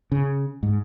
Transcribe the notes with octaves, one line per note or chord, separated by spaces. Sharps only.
C#3
G#2